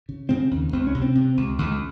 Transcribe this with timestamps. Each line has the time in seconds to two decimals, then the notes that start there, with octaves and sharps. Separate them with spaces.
0.09 C#3
0.29 C#3 C4
0.51 D#2
0.72 C#2 C4
0.87 C#4
0.95 C3
1.02 C4
1.15 C3
1.37 C#2
1.58 C#2